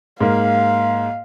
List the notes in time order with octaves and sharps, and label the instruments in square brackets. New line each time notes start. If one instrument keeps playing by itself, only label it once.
[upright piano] G#2 A#3 [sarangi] F5